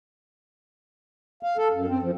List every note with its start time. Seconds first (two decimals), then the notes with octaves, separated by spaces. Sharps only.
1.43 F5
1.57 A4
1.72 F#2
1.88 C4
2.02 F3